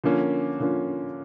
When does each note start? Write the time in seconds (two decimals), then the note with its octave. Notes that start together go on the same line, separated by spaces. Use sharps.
0.04 D3 F3 A#3 C#4
0.60 D3 F3 A#3 C#4